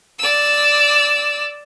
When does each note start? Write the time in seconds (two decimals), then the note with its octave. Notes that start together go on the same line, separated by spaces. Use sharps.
0.19 D5 E6